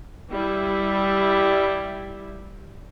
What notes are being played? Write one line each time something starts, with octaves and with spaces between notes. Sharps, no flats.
G3 E4